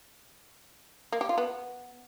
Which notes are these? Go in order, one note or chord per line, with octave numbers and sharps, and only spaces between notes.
A#3
G4
F4
B3